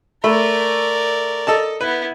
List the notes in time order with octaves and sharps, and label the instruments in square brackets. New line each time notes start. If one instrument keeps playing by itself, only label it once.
[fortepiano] A3 E5 B5 [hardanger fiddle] A#4 D5
[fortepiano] A4 D#5 A5
[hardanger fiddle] B3 E4 [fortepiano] B4